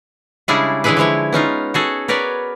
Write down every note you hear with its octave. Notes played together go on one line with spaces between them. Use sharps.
C#3 G3 G#3 D4 E4 G#4
D3 E3 G#3 E4 G#4 B4
D3 F3 G#3 E4 C#5
B3 C#4 D#4 F4
F#4 G#4 A4
B3 A#4 B4 C#5 D5